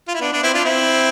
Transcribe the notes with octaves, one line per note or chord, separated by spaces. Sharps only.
F4
E4
B3 D4
B3 D4
C4 E4
D4 F4
C4 E4